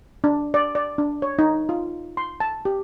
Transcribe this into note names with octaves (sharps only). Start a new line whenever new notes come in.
D4
D5
D5
D4
C#5
D#4
F4
C6
A5
G4